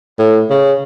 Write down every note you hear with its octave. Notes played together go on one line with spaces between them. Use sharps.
A2
C#3